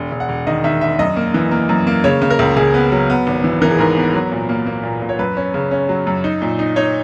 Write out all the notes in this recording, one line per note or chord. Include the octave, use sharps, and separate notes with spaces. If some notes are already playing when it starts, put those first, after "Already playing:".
Already playing: E1
E1
F#5
E1
D#3 D#5
D#3 E5
E1 E5
F#2 D#5
A#3
E3
A#3
F#2
A#3
C#3 C#5
C#3
A#4
C#2
C#2 G#4
B3
F#3
B3
G#1
E3
E3 A#4
G#4
G#2 A#4
B3
F#3
A#2
A#3
A#3
A#2
A#2
C#5
F#2 B4
C#4
C#3
C#4
F#3
F#2
D#4
A#2
D#4
D#4 C#5